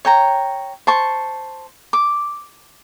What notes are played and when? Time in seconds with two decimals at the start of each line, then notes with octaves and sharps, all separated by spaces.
0.05 C#5 G5 A#5
0.87 C5 A5 C#6
1.93 D6